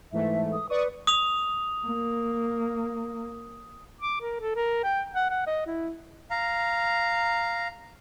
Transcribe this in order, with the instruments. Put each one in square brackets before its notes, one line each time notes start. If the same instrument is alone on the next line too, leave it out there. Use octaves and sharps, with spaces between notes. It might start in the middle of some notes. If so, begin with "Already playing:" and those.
[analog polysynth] G#2 E3 A3 [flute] E5
[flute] D#6
[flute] B4 [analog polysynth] D5 C#6 D#6
[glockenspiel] D#6 F7
[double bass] A#3
[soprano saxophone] D6
A#4
A4
A#4
G5
F#5
F#5
D#5
E4
[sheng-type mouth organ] F5 A#5